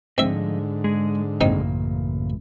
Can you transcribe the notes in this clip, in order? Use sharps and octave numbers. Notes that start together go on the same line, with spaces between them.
G#2 D3 F3 A3 C4 D#5 E5
G#3 G#4
A1 F#2 C#3 A#3 C4 D#4